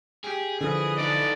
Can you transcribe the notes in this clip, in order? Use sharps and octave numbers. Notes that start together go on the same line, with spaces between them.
G4 G#4
D3 E3 F3 D#5
D#4 A4 D5